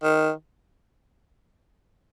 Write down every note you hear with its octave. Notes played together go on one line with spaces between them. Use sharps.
D#3